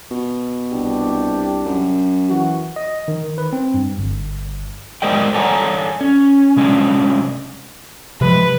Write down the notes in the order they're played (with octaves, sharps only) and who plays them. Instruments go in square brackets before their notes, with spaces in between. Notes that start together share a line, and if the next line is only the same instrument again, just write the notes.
[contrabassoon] B2
[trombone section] C2 D4 G4
[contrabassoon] F#2
[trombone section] E3 F#4
[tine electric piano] D#5
D#3
B4
C4
G2
G1
[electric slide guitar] G#3 A#4 C5 D5 D#5 G5
A4 C#5 D5 F#5 G#5 A#5
C#4
C3 G#3 C#4 D4
[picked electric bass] C3 F3 G#3 [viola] B4